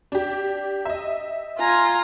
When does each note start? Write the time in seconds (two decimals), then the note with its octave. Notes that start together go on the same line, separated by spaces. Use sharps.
0.12 D4 G4
0.85 D#5 E5
1.59 F4 G#5 A#5